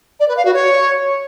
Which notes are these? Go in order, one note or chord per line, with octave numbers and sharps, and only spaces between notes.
D5
B4
F5
F#4
C#5